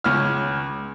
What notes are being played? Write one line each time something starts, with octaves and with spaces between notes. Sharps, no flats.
C#2 C#5 F6